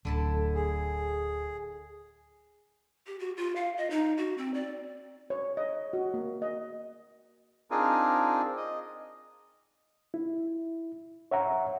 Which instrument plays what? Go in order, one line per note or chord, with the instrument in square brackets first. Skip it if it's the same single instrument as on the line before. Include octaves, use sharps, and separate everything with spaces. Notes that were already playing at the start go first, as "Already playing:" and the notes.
[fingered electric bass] D1 [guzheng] D3 E4 A5
[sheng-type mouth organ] G#4
[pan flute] G4
F#4
F4
F5
D#5
D#4
F#4
C4
D5
[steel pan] C#5
D#5
F#4
A#3
D#5
[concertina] C4 D4 D#4 F4 G#4 A#4
D#5
[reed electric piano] E4
C#5 E5 F#5 A#5